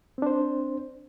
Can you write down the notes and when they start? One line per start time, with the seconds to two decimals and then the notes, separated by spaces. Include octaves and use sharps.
0.18 C4
0.22 D4
0.26 C5